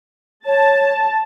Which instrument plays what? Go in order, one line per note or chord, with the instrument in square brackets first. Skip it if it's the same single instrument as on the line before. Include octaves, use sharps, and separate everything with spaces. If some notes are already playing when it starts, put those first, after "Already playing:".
[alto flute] C#5 [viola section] A5